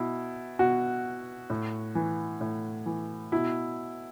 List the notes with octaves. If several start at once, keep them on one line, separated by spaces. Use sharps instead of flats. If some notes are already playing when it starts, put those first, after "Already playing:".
Already playing: B2 E4
B2 F#4
A2
E3
A2
E3
B2 E4